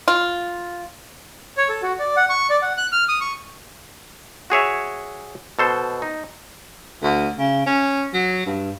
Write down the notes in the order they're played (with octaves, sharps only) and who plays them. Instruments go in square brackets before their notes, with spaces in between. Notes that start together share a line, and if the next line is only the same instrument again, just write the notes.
[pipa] F4
[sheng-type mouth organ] C#5
A4
F#4
D5
F#5
C#6
D5
F#5
F#6
F6
D#6
C#6
[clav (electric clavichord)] F#4 G#4 C#5 E5
B2 A4 C5
D#4
[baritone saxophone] D2
C#3
C#4
F#3
G2